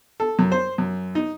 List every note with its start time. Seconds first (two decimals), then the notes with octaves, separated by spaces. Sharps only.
0.20 A4
0.39 F#2
0.52 C5
0.78 F#2
1.15 D#4